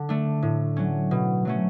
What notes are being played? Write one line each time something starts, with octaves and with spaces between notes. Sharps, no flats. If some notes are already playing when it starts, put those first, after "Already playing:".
Already playing: D3
A3 D4
A2
F#3 C#4
B2
F#3 A3 C#4